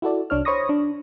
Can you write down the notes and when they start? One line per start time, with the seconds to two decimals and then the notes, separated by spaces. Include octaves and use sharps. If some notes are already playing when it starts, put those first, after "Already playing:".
0.02 E4 F#4 A4 D5
0.30 C2 D4 C#5 F6
0.45 C5 C#5 B5 C#6 D#6 A#6
0.69 D4